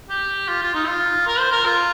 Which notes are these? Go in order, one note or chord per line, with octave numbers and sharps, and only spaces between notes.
G4
F4
F4
D#4
F4
A#4
C5
A#4
F4